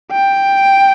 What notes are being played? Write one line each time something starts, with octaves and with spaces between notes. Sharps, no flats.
G5